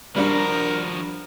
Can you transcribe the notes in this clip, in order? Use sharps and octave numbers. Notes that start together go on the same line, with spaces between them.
F3 G3 D4 F#4 A#4